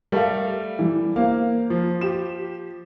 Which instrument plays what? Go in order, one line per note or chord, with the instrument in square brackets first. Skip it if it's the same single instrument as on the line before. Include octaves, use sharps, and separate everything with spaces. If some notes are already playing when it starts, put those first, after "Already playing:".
[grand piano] G3 A3 [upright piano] A#4 F5
[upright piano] E3 G3
[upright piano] A#3 C5 [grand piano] F5
[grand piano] F3
[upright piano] G4 E7